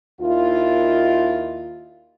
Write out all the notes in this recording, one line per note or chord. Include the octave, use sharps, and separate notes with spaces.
D#2 D#3 E4 F4